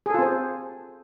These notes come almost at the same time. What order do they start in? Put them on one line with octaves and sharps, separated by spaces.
G#4 A4 F4 C4 C5